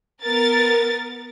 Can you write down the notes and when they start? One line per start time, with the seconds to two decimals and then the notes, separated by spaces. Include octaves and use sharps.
0.24 B3 A#4 A6